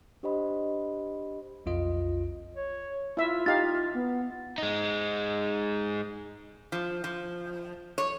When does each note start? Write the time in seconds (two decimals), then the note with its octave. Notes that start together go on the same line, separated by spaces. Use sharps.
0.23 D4 G4 C5 D#5 B5
1.66 B1 F2 F4 D#5
2.55 C#5
3.17 E4 F4 E5
3.46 D#4 G4 F5 A6
3.94 B3
4.58 G#3 D#4
6.72 F3
7.04 F3
7.98 C#5